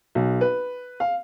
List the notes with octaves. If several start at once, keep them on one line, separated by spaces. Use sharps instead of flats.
B1
B4
F5